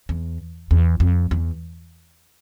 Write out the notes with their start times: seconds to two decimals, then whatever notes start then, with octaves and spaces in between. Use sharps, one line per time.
0.09 E2
0.71 E2
1.00 F2
1.31 E2